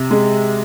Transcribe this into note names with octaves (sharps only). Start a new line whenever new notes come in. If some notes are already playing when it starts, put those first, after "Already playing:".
Already playing: C3
G#3